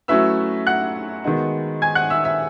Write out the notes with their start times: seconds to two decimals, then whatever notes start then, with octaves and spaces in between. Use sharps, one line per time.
0.08 F#3 A3 C#4 E4 B4 E5 E6
0.67 F#5 F#6
1.24 D#3 G#3 B3 D#4 F#4
1.82 G#5 G#6
1.95 F#5 F#6
2.10 E5 E6
2.24 E5 E6